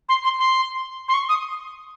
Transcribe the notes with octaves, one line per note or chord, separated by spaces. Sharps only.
C6
C6
C6
C6
C#6
D#6